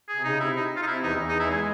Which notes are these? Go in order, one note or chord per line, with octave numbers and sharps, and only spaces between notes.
G#4
C3
C#3 D#4
C3 E4
D#4
F4
D#4
C3 E4
E2 E3 D#4
E2 E3
D#4
E4
G#3 G#4